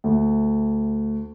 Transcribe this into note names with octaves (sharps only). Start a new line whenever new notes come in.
D2